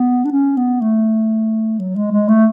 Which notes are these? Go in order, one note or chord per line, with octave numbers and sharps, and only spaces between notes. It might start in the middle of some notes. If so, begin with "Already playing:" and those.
Already playing: B3
D4
C#4
B3
A3
F#3
G#3
G#3
A3